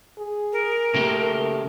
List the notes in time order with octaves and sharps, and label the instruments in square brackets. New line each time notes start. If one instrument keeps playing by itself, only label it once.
[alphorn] G#4
[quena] A#4
[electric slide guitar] C#3 A#3 G4 [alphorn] A3